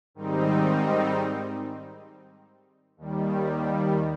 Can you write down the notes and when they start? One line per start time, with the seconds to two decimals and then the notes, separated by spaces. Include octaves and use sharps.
0.15 G#2 D#3 G3 C4 D#4
2.97 D#2 D#3 G3